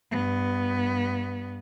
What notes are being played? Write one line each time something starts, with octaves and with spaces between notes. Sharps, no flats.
G2 B3